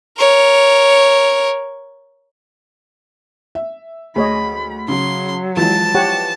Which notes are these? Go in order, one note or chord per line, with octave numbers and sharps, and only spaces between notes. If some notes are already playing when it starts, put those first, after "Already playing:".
A#4 C#5
E5
D2 G#4 C#5 D#5 B5
C#3 F#3 C6
E3 F3 G#3 A5
G4 C#5 F#5